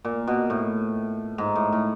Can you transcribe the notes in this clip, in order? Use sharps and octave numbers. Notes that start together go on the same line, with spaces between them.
A#2
B2
A2
G#2
A2
A2